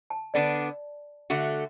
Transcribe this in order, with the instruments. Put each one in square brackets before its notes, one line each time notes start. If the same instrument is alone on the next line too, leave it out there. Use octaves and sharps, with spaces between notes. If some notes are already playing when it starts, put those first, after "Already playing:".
[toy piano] A5
[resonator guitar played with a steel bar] D3 B3 D4 [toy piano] D5
[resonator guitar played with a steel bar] D3 A3 F#4